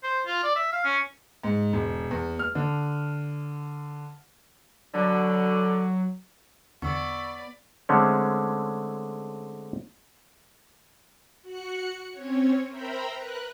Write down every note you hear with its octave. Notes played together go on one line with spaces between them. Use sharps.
C5
F4
D5
E5
F5
C#4
G#2
E1
E2
F6
D3
B2 D3 F#3
E2 D3 B3 D5 B5 C#6 E6
D3 G#3 A3 C4 C#4
F#4 F#6 C#7
C4 C#4 C#5
A#4 C5 E5 G5 A#5 B5
A#4 B4 F#6